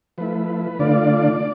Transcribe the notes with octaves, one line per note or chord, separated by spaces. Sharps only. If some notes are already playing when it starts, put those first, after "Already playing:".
F3 A3 E4 B4
D3 A3 D4 F4 D5